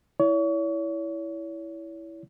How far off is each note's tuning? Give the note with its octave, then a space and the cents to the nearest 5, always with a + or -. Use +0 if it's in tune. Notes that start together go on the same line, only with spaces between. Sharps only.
E4 +0 C#5 +35